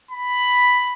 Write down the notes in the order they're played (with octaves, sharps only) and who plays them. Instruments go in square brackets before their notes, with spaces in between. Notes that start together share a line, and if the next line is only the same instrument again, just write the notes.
[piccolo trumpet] B5